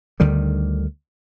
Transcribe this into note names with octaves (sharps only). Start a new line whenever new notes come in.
D2 D3 D#3 G3